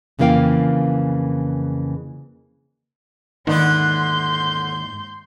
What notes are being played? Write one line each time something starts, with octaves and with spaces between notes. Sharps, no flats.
F2 C#3 E3 A#3 F5 G5
G#2 D3 D#3 A#3 B3 E4 C6 G6